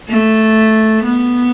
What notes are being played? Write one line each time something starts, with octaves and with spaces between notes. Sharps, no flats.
A3
B3